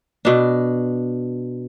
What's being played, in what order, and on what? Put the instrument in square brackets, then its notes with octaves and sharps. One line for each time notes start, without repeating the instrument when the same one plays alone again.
[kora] B2 D4